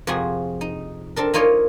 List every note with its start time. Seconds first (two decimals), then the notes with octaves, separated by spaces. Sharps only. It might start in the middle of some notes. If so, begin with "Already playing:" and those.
0.07 F2 C3 F3 F#4 G#4
0.61 D#4
1.16 C4 D4 A4 A#4
1.34 A#3 D#4 F4 C#5 D5